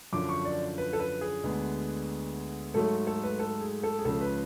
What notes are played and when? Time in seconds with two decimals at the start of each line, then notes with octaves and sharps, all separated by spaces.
0.13 F#2 D3 F3 D6
0.29 C#6
0.45 D5
0.78 B4
0.93 A4
1.00 B4
1.21 G#4
1.43 D2 D3 G#3 B3
2.74 G#2 F#3 A3 A4
3.07 A4
3.23 B4
3.39 A4
3.61 G#4
3.83 A4
3.99 G#4
4.05 C#2 C#3 F3 A4
4.21 B4